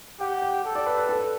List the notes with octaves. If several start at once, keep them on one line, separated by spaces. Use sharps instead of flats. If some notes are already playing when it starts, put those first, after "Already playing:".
G4 F#5
G5
A4
D5
B4
B4
A4